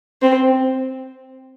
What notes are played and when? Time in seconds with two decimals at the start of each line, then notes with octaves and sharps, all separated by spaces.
0.22 C4